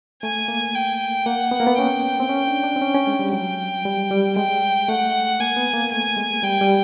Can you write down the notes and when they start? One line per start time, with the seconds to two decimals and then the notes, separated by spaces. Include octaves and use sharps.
0.23 A3 G#5
0.48 A#3
0.75 G5
1.26 A#3 F#5
1.51 B3
1.60 A#3
1.67 B3
1.78 C#4 G5
2.20 C4
2.29 C#4
2.47 D4
2.63 D4
2.76 C4
2.82 C#4
2.94 C#4
3.07 G#3
3.19 G3
3.32 F#3 G5
3.85 G3
4.11 G3
4.37 G#3 G5
4.88 A3 F#5
5.40 A#3 G#5
5.56 B3
5.74 A#3
5.91 A3 G#5
6.17 G#3
6.43 G3 G5
6.61 G3